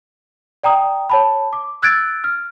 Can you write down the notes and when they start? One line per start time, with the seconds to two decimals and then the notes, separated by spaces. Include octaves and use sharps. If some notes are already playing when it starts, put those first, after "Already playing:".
0.63 D5 G5 A#5 D#6
1.10 C#5 A5 B5
1.53 D6
1.82 E6 F#6 G#6 A6 D7
2.24 F6